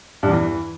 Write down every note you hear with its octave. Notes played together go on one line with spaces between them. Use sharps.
G2
E2
E3